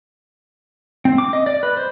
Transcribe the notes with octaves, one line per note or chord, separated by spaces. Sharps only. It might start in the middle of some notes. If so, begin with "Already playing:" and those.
C4
D6
D#5
D5
B4
C5